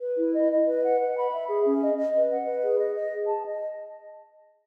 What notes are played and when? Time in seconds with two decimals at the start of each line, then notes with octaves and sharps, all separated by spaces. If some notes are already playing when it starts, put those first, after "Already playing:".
0.01 B4
0.18 E4
0.34 D#5
0.51 D#5
0.67 B4
0.83 F#5
0.99 B4
1.16 B5
1.33 E5
1.49 G#4
1.65 C#4
1.81 D#5
1.98 D#5
2.14 B4
2.31 F#5
2.47 B4
2.64 G#4
2.80 D#5
2.96 D#5
3.13 G#4
3.29 A5
3.45 D#5